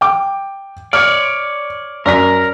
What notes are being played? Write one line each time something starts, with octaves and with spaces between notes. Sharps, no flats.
G5 D6
C#5 D5 F6
F#2 A#4 D5 B6